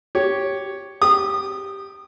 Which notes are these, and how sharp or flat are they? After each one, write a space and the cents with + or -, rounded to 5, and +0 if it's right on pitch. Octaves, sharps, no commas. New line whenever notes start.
G4 -5 C#5 +0
G4 +0 D#6 -25